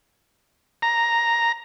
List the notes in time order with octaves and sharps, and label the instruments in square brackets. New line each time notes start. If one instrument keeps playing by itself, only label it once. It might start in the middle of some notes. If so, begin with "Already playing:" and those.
[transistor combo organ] A#5